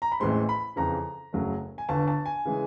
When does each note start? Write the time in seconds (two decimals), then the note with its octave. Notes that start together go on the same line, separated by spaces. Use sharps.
0.02 A#5
0.12 B5
0.20 A1 A2 E3 G#3 C4 C6
0.49 B5
0.76 F2 C#3 E3 A#5
1.33 F#1 F#2 C#3 F#3 A3
1.78 G#5
1.89 G1 G2 D3 A5
2.08 A5
2.26 G#5
2.45 C#3 E3 G#3